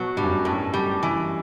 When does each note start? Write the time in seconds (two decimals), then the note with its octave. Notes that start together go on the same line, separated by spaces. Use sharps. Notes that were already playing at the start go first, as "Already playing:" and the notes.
Already playing: B2 F#3
0.17 G2 G3
0.23 F#2
0.31 G2
0.45 A2
0.74 G3
1.03 E3